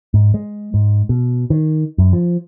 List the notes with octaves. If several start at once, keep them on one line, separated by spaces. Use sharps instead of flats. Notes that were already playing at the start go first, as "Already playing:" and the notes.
G#2
G#3
G#2
B2
D#3
F#2
F3